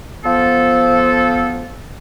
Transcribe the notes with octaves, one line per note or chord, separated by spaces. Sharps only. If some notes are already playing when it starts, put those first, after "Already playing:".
F3 B3 A4